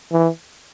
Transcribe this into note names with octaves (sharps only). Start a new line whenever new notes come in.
E3